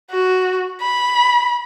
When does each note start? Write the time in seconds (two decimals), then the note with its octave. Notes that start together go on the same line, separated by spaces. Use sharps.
0.11 F#4
0.81 B5